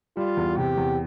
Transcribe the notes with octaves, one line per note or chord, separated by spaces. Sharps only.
G3 F4
E2
C3 G4
E2